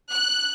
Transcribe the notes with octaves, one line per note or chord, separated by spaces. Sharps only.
F#6